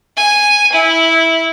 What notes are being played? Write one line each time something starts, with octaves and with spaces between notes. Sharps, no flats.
G#5
E4